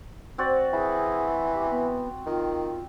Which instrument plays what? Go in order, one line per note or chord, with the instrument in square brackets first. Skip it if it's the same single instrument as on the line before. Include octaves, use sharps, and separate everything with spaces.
[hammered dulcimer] C4 F#4 D5
[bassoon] E3 [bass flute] G#4
[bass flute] G4
B3
[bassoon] D#3 [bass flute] F4